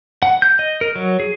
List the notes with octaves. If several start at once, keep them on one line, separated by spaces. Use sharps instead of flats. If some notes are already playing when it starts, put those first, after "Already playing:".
F#5
G6
D#5
A#4
F#3
G#4